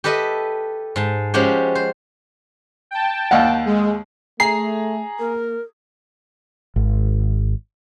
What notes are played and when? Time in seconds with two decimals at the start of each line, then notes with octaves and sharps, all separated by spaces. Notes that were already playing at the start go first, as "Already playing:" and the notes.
0.04 G4 A4 B4 D#5 E5
0.96 G#2 A5
1.34 F3 G#3 C#4 F#4 G4
1.75 C5
2.91 G5 A5
3.31 D#2 F5 F#5
3.66 G#3
4.40 A3 G#4 A#5 C7
5.19 A#3 A#4
6.76 G#1